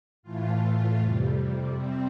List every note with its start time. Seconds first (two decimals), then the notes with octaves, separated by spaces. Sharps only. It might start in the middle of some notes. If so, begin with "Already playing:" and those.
0.23 A2 E3 A3 F4
0.99 F2 C3 G3
1.76 C3 G3 C4